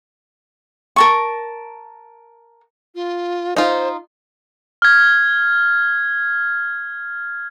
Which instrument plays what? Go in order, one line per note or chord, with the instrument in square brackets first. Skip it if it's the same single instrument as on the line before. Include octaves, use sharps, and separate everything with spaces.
[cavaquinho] A#4 A5 C#6
[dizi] F4
[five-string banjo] D#4 F4 [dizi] C5
[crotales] F6 G#6